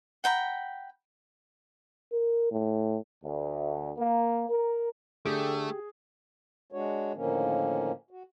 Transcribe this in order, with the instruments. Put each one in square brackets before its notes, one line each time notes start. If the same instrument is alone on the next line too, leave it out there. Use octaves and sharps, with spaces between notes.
[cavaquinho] F#5 G5 A#5 B5
[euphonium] A#4
A2
[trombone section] D2
A#3
A#4
[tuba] D3 [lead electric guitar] A3 [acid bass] G4 [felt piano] G#4
[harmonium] G#3 D4 F#4 C#5
A2 D3 D#3 F3 A#3 C#4
F#4